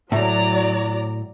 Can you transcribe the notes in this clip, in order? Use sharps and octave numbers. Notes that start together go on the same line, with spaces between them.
A2 F#3 D5 A#5